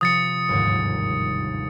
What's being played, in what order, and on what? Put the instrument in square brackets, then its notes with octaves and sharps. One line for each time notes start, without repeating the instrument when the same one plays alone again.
[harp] C3 F3 [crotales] D#6 A6 C#7
[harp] G1 D#2 G#2